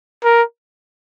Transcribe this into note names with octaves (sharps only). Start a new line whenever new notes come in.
A#4